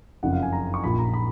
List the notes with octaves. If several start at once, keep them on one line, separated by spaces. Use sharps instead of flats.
F#1 F2 C#3 F3 F#5
F5
G#5
A#5
C#6
A#1 A#2 F3 B5
A#5
B5